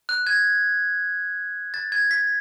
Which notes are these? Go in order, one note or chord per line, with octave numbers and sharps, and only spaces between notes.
F#6
G#6
A6
G#6
B6